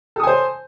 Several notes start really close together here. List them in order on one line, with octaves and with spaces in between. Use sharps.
A4 D#6 G#5 C5